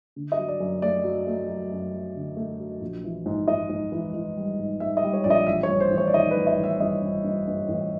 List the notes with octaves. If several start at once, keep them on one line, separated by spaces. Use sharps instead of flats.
D3
D#5
F#3
D5
F#2
A3 D5
F#3
A3
F#3
F#2
F#3
D3
A3
F#3
A#1
E3
G#2
G#2 D#5
G#2
E3
E3
G3
G#2
G#2 E5
D#5
G3
C#5
A#1 D5
D#5
A1 E5
C#5
G2
C5
A1
C#5
D5
D#3 D#5
B4
A1
D#5
A1
E5
G2 D#5
G2
G2
G2
A1